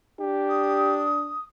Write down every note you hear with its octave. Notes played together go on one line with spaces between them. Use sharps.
D4 G4
D#6